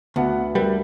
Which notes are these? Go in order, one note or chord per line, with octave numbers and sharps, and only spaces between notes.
D2 B3 F#5
G3 A#4 B4 E5